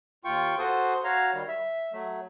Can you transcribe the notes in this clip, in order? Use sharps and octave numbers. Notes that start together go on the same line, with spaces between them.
D#2 F4 G5 C#6
F#4 A4 C5 C6 D#6
F#4 C#5 F5 A#5
D#3 G3
E5
F#3 A3